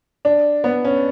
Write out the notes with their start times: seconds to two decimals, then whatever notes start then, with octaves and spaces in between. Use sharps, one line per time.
0.25 D4
0.64 B3
0.84 C#4